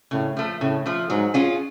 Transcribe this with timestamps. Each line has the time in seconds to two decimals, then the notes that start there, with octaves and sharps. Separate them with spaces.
0.11 A2 C#3
0.37 F3 A3
0.61 A2 C#3
0.86 F3 A3
1.09 G#2 F#3
1.34 C#4 F4 G#4